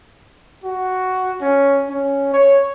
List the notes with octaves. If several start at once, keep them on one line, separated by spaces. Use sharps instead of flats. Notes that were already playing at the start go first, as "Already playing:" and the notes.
F#4
C#4
C#4
C#5